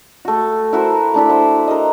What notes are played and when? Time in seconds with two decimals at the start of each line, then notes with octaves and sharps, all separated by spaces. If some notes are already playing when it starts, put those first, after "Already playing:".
0.25 A3 F#4
0.73 E4 F#4 A#4 C5
1.14 A3 D4 E4 B5
1.29 C5 F#5
1.68 A#4 D#5